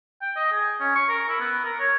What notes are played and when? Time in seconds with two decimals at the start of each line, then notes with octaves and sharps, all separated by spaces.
0.22 G5
0.36 D#5
0.52 G#4
0.80 C#4
0.95 C#6
1.09 A#4
1.29 E4
1.40 B3
1.64 A#4
1.80 C#5